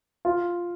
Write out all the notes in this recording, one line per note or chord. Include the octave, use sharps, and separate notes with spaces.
F4